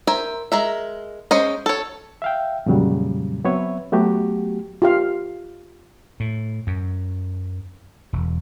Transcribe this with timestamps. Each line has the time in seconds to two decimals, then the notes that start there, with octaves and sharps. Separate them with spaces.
0.07 A#4 C5 E5 G#5
0.52 G#3 A#4 E5
1.31 G#3 C#4 C5 D#5
1.66 A4 C#5
2.22 E5 F5 G5
2.66 F2 A#2 C#3 F#3 G3
3.44 F#3 B3 C4 B4 C#5 E5
3.92 F#3 A3 B3 F#4 G4
4.82 F4 G4 F5
6.20 A2
6.67 F#2
8.13 E1